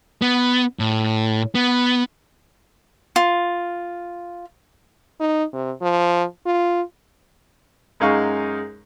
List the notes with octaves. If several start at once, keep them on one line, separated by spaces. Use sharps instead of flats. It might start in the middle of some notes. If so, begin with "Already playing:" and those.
B3
A2
B3
F4
D#4
C3
F3
F4
F#2 G#3 D#4 F5 C#6